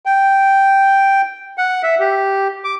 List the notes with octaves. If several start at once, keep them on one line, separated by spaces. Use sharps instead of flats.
G5
F#5
E5
G4
D6